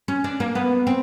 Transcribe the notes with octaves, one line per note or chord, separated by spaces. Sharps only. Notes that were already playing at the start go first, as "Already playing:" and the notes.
C#4
D4
A#3
B3
C4